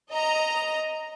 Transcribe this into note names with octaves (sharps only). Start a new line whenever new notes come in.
D#5 A#5